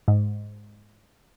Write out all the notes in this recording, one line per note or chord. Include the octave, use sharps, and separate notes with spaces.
G#2